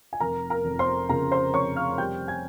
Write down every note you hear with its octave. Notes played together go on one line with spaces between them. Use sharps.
G#5
F1 A#4 A#5
A#4 A#5
F1
C5 C6
C#3 A#4 A#5
C5 C6
F1 C#5 C#6
F5 F6
G3 G5 G6
G#5 G#6